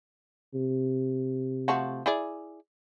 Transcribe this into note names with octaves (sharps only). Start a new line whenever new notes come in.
C3
F3 A3 F#4
E4 G#4 D5